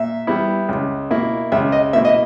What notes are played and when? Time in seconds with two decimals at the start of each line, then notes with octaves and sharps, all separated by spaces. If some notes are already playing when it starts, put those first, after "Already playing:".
Already playing: A#2 E5
0.27 G3 B3 E4
0.69 C#2
1.11 B2 A#3 E4
1.52 C#2 E5
1.72 D#5
1.93 B2 A#3 E4 E5
2.05 D#5